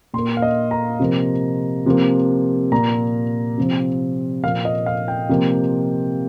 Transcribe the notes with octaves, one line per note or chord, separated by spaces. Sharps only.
A#2 C6
A#3
F5
D#5
A#5
C3 F3 A#3
C3 F3 A#3
A#2 A#3 A#5
C3 F3 C4
A#2 F3 A#3 F5
D#5
F5
G5
C3 F3 A#3